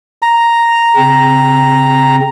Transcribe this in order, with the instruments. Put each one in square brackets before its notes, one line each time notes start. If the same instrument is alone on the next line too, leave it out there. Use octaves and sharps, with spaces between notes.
[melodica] A#5
[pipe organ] C#3 C4